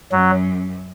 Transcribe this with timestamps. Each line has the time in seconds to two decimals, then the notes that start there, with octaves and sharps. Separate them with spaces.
0.11 F#2 F#3